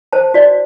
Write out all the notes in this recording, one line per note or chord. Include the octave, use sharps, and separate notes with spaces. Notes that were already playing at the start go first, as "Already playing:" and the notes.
C5 A5
F#4 D5